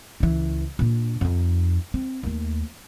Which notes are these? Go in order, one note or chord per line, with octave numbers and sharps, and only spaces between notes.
C#2 E3
A#2 D4
F2 D#4
C4
D#2 A3